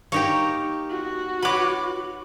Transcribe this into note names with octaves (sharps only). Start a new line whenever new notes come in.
A#3 D#4 G4 C#5
F#4
B4 C#5 B5 D6